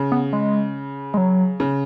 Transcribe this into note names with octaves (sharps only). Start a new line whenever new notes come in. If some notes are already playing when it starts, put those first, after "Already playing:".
Already playing: C#3
B3
G#3
G#3
F#3
C#3